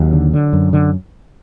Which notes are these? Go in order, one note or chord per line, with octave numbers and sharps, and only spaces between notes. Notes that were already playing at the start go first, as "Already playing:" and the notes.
Already playing: D#2 F#3
D3
D3
F#2
D3